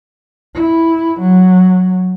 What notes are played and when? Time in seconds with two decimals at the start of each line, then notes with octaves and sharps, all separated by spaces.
0.55 E4
1.20 F#3